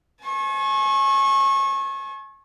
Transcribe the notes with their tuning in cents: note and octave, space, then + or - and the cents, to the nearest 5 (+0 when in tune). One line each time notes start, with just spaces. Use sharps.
G#5 +40 C#6 -30